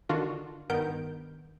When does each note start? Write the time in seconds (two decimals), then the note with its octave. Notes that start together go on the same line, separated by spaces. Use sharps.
0.09 D3 D#3 D4 F4 F#4
0.70 G2 D#3 B3 A#4 G6 D7